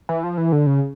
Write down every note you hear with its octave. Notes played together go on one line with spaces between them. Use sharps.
E3
F3
E3
D3
C#3